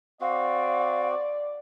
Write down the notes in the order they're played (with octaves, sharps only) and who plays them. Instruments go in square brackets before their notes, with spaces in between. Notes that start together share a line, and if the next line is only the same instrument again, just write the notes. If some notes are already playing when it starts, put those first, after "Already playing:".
[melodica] C4 F#4 [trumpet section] D5 [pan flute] F5